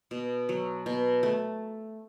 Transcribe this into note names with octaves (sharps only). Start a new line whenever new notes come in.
B2
F#3
B2
A3